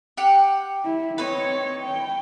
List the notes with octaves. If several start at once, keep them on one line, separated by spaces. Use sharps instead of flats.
G4 F#5
E4
C4 D#4 B4 C#5
G5